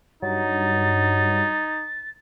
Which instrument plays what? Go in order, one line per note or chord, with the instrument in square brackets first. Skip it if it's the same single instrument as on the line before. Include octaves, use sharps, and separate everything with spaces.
[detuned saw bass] G2 [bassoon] F#3 [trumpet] D#4 [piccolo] A6